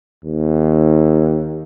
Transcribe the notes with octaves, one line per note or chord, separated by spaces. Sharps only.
D#2